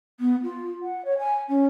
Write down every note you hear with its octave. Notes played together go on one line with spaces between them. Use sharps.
B3
F4
F#5
C#5
G#5
C#4